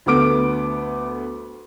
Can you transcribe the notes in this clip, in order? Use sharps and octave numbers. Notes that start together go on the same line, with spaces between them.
D2 A3 B3 D6 D7